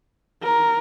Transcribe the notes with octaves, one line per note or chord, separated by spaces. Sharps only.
A#4